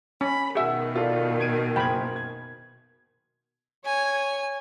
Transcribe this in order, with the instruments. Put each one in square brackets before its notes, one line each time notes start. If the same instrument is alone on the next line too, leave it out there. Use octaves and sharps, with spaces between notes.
[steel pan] C#4 [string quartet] B5
[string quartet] B2 D#3 [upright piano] F#4 [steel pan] G#4 E5
[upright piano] F4 A4 D5
G#6 D7 D#7
[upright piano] F#1 G#6 [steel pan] G5 B5
[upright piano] G#6
[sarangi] C#5 [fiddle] G#5